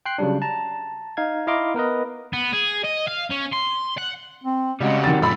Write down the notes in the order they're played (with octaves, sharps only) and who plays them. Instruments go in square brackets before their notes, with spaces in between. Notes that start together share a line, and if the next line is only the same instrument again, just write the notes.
[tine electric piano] G5 C6 F#6 C7
C#3 F#3 G3 D4
A5 A#5
D#4 F5 G#6
E4 D#5 F5 A#5 C6 D6
B3 A#4 B4 D#5
[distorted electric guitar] B3
G#4
D#5
F5
C#4
C6
F#5
[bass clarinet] C4
[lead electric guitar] C#3 [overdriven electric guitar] G3 F#4 [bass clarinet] G#3
[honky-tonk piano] D#3 A6 [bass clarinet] C4
[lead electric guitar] F#2 A3 [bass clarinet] A#2 [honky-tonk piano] B5 E6